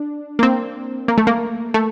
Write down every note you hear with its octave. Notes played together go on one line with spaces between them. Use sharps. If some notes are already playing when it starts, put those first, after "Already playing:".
Already playing: D4
A#3
C4
A#3
A3
A#3
A3